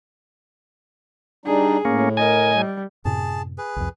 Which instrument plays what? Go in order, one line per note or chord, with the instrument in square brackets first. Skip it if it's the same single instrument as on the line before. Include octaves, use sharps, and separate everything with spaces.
[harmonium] G3 D4 D#4 [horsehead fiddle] G#4
[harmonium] A2 [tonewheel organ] A#3 C#4
[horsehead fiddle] A#4 D#5 [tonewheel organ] G#5
[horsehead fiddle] G3
[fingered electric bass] F#2 A2 C3 [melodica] G#4 A5
[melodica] G#4 B4
[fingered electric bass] C2 F2